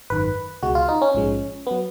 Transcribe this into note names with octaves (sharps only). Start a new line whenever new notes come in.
G#1 F#2 D#3 B4
C#2 B2 G#3 F#4
F4
D#4
C#4
A#1 G#2 F3 G#3
F#3 B3